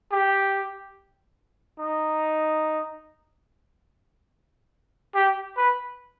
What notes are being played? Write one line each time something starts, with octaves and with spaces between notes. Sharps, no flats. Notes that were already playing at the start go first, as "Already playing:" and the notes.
G4
D#4
G4
B4